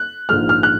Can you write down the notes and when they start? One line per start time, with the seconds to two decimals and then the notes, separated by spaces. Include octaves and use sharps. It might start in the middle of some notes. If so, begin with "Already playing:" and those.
Already playing: F#6
0.29 A#1 G#2 F3 G#3 F6
0.49 F6
0.63 F#6